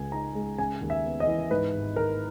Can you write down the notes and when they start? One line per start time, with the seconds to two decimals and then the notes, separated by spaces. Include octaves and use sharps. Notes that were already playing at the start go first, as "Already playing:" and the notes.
Already playing: C#2 C#3 G#5
0.12 D#4 A#5
0.35 G#3
0.58 C#3 G#5
0.81 D#2
0.90 E5
1.05 B3
1.20 D#5
1.27 E3
1.51 G#2 B4
1.74 G#1
1.96 G#1 A#4